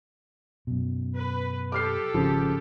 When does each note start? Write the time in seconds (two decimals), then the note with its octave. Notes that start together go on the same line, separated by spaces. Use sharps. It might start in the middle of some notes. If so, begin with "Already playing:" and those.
0.67 F#2 B2
1.15 B4
1.72 G4 A4 D6 F6 C7
2.14 G#1 C#3 F3